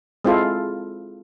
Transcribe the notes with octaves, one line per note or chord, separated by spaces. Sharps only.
G#3 C4 E4 F4 A4